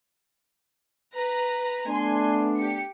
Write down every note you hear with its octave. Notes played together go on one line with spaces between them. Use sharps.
B4 A#5
A3 B3 D4 G#5 C6
G4 C#7